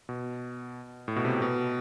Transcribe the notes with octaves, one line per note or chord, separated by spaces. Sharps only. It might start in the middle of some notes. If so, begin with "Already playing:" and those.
B2
A2
B2
C3
B2